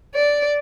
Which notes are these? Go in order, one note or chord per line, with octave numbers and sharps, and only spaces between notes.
D5